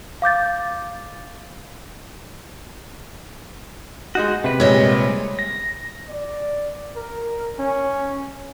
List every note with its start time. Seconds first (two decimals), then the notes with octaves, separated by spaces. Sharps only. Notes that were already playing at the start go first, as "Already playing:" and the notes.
0.22 F5 D6 G6 A6
4.15 G#3 D#4 F#4
4.44 C3 B4
4.60 A#2 G3 G#3 C#5 D#5
5.39 A#6
6.09 D5
6.96 A#4
7.59 C#4